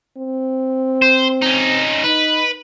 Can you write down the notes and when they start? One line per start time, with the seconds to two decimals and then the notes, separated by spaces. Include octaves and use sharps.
0.17 C4
1.02 C5
1.42 C#4 D#4
2.04 D#4 B4